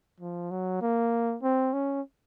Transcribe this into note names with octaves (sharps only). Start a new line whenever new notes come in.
F3
F#3
A#3
C4
C#4